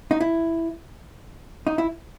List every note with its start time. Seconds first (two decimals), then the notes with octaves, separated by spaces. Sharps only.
0.11 D#4
0.20 E4
1.67 D#4
1.78 E4